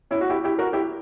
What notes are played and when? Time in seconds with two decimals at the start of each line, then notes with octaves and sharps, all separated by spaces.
0.11 C#4 E4
0.21 F#4
0.30 E4 G4
0.44 E4 G4
0.58 F#4 A#4
0.73 E4 G4